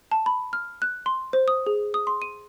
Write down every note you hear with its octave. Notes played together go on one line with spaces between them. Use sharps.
A5
B5
F6
F#6
C6
C5
D#6
G#4
D#6
C6
D#7